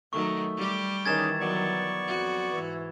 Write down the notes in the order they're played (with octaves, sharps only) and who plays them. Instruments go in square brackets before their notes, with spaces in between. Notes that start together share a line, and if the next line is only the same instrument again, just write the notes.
[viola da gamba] D#3 F#3 [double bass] A3 [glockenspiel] C#6
[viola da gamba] G3 G4
[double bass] D#3 E3 [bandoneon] C#4 D#4 G#4 [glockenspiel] G#6 A6 E7
[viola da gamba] F#3 [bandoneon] B3 D5 C#6
[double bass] F2 F#3 [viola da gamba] F#4
[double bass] G#2 E3